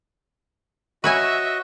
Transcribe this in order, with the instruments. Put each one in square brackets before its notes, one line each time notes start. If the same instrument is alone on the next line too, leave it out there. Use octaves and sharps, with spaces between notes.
[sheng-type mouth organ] F#4 D#5 [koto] B4 C#5 G#5 [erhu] E5 [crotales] C#6 F#6